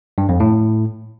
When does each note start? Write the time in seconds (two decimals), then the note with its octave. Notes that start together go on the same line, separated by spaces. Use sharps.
0.18 G2
0.29 F2
0.40 A2